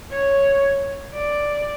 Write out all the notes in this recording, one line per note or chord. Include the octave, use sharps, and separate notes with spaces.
C#5
D5